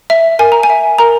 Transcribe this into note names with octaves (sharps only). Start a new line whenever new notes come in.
E5
A#4 G#5
A#5
G#5
E5
A#4 A#5